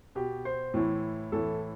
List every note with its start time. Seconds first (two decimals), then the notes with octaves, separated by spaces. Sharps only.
0.15 B2 G4
0.45 C5
0.74 A2 E3
1.32 A2 E3 A4